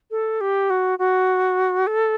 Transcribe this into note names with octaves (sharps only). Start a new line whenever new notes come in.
A4
G4
F#4
F#4
A4